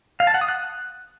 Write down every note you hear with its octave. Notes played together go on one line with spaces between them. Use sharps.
F5
A5
F#5
D#6
F#6